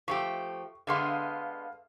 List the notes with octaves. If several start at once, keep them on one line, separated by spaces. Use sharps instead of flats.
F3 A3 G4 C#6
D3 G#3 B3 E5 F5 C6